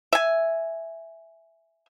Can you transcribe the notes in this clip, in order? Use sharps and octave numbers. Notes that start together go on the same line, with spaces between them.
E5 G#5